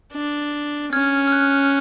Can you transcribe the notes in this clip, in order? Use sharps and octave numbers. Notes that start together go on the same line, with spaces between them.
D4
C#4 F6 G#6
F6
F#6